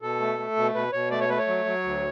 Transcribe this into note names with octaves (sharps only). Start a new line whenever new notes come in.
B2 A4
A3
A3
B2
B2 B4
B2 C#5
A3 D5
C#5
A3 B4
C#5
F#3
F#3
D2